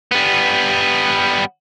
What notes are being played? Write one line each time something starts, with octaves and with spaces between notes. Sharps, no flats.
G3 B3